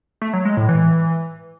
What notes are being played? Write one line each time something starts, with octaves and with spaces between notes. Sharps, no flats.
A3
F#3
G#3
A2
E3